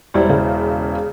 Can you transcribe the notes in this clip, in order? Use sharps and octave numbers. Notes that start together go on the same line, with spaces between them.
E1 G3 E4 C5
C#3